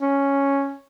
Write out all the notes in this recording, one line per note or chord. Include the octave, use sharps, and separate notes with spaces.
C#4